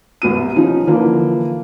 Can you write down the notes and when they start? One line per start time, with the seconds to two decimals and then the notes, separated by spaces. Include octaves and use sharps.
0.22 C2 B2 D#7
0.56 F3 C#4 D#4
0.87 D3 E3 F3 A#3